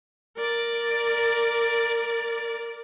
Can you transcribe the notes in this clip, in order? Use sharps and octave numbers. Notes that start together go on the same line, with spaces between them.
A#4 D5